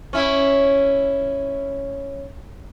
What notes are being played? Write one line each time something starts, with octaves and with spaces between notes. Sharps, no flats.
C#4 E4